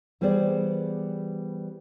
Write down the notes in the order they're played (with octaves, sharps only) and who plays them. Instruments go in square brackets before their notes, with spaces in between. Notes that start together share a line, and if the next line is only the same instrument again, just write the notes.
[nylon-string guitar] E3 G3 B3 G#4 C5 D5